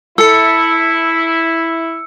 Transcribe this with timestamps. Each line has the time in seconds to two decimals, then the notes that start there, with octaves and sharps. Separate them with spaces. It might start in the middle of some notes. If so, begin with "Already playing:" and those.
0.18 E4 A4 E6 C#7